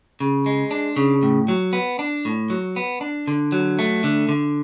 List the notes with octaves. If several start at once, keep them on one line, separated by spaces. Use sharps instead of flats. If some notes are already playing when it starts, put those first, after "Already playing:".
C#3
G#3
D4
C#3
A2
F#3
B3
D4
A2
F#3
B3
D4
D3
F#3
A3
D3
D3